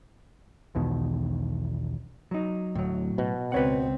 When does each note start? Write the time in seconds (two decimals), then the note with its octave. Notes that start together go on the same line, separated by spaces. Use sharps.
0.75 B1 E2 B2 D#3
2.31 F#3 D#4
2.75 D1 A2 F#3
3.18 B2
3.52 C#2 C4 B4 C#5 F#5